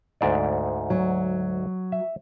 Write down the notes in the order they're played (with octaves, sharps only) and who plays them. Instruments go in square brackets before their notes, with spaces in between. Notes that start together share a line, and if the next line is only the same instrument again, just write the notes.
[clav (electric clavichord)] D2 G#2 D5
[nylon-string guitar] F#3
[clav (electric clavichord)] E5